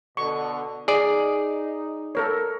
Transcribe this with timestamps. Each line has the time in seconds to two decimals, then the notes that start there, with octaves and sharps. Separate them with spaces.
0.17 B2 D3 C#6
0.88 D#4 G#4 D5
2.15 A4 A#4 C#5